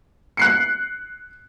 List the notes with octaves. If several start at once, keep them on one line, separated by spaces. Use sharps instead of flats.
F#6 C7 C#7